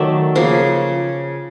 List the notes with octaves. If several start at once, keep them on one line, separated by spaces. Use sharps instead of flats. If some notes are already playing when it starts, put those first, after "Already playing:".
Already playing: D#3 F#3 A3 D5 E5
C#3 F3 A#3